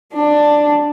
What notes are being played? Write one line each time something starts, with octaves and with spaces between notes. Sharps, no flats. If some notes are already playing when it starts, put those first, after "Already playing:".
D4